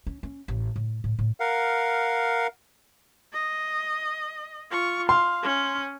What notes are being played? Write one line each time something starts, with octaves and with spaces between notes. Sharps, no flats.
C#4
C#4
A1
A2
A2
A2
A#4 F5 F#5
D#5
F4 C#6
F5 C6
C#4